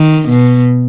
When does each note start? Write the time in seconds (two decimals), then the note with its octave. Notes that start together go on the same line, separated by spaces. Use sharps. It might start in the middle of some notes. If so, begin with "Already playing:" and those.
Already playing: D#3
0.29 B2